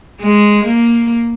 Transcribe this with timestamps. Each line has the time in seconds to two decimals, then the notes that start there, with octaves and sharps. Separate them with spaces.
0.20 G#3
0.65 A#3